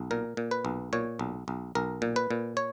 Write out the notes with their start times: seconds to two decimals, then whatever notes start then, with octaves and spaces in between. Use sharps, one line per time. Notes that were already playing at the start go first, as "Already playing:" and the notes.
Already playing: B1
0.11 A#2 A#4
0.37 A#2
0.51 B4
0.65 B1
0.93 A#2 C#5
1.19 B1
1.48 B1
1.75 B1 A#4
2.02 A#2
2.16 B4
2.31 A#2
2.57 C#5